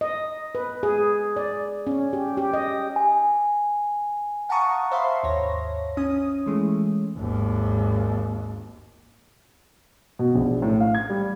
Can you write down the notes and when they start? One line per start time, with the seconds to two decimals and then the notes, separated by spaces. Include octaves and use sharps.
0.01 D#5
0.55 B4
0.83 G#4
1.36 D5
1.87 C#4
2.13 G4
2.37 G4
2.53 D#5
2.96 G#5
4.49 F5 F#5 A5 A#5 C#6 D#6
4.91 C5 E5 F5 B5 C6
5.23 G#1 D#2 C#5 A#6
5.97 C#4 D#6
6.46 E3 G#3 A3
7.17 G#1 D#2
10.19 B2
10.35 A#1
10.62 A2
10.80 F5
10.95 G#6
11.10 G3